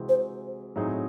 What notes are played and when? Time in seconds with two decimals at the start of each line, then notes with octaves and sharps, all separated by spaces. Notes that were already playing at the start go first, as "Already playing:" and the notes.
Already playing: C3 E3 G#3 C4 F#4
0.09 C5
0.76 A2 F#3 C4 D#4 G#4